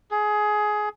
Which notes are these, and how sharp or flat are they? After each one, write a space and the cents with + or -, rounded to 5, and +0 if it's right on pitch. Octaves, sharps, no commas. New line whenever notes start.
G#4 +15